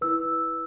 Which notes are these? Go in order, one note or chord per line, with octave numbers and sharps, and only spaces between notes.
E4 B4 E6